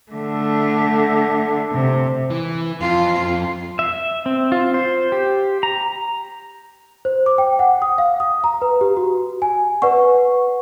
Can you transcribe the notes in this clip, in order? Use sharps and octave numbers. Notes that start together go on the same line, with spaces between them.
D3 A3
C3
E3
F2 F4
E5
C4
F4
C5
G4
A#5
C5
D6
G5
F#5
D#6
F5
D#6
A#5
B4
G4
F#4
G#5
B4 D5 F#5 C#6